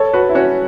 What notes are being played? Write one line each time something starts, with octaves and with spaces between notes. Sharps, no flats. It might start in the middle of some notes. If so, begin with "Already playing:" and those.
Already playing: A4 C#5
F#4 B4
E4
C#4 F#4